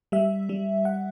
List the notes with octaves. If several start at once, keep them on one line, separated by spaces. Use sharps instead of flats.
G3 E5
G3
F#5